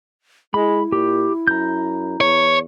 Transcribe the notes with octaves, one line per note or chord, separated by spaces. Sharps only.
G#3 E4 B5
A#2 G4
F#2 A#5 G6
E2 C#5